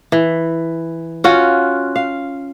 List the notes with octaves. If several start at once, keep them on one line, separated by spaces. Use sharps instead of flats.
E3
C#4 F4 F#4
F5